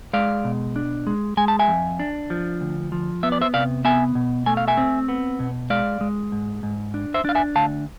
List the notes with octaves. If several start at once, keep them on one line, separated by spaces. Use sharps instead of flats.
G#3 D5 F5
B2
D4
G#3
G#3 G#5
A5
E5 G#5
F2
D4
F3
D2
F3
B3 E5
D5
C5 E5
C3 D5 F5
B3 E5 G#5
B2
A3 G#5
F5
E5 G#5
C4
B3
B2
G#3 D5 F5
G#3
G#2
G#2
D4
C5 E5
D4 F5
E5 G#5
D2 F5 A5